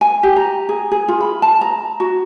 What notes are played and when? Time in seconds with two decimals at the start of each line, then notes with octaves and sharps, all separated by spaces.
0.01 G#5
0.23 G4
0.36 A#5
0.69 G#4
0.91 G#4
1.08 F4
1.21 B5
1.42 A5
1.61 A#5
2.00 F#4